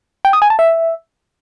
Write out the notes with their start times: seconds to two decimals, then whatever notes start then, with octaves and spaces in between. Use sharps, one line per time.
0.25 G5
0.33 D#6
0.42 G#5
0.50 A5
0.59 E5